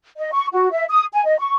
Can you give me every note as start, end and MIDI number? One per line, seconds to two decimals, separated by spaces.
0.17 0.31 75
0.32 0.47 85
0.53 0.68 66
0.72 0.84 76
0.89 1.05 87
1.13 1.23 80
1.26 1.37 75
1.39 1.57 85